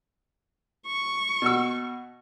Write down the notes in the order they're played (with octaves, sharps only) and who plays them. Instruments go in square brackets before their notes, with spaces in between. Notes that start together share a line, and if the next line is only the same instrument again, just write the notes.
[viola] C#6
[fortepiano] B2 F#4 E6